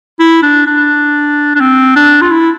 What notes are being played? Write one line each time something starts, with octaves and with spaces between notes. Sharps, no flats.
E4
D4
D4
D4
C4
D4
F4
E4